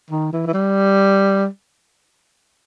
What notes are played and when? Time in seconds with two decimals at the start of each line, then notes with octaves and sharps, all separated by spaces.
0.10 D#3
0.32 E3
0.47 E3
0.53 G3